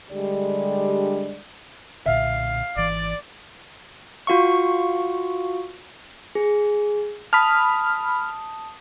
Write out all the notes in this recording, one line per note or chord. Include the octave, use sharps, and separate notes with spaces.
D3 G3 G#3 D4 G4 D5
B1 A#2 D3 E5 F5
G#1 E3 D5
F4 F#4 F5 C#6
G#4
A5 B5 D#6 F6